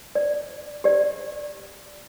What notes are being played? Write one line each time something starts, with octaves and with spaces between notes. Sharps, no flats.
D5
G4 D5